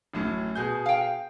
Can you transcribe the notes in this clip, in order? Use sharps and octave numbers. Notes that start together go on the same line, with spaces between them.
A1 F#2 A2
B2 G#4 G6
F5 G5